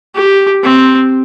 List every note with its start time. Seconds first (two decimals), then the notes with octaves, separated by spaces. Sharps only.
0.15 G4
0.63 C4